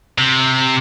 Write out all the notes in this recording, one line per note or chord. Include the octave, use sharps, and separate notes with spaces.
C3